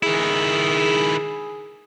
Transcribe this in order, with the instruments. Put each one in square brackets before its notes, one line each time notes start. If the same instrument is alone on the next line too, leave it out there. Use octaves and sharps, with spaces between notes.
[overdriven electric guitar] D#3 E4 [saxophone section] G#4